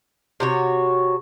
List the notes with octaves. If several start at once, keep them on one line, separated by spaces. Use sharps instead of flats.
C3 F#4 C#5